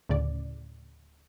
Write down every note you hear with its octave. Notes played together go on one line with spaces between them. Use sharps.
D2 A2 C#3 D5